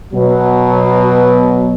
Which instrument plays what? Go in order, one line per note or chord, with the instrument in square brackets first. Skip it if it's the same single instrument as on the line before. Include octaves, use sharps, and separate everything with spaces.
[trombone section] B2 F#3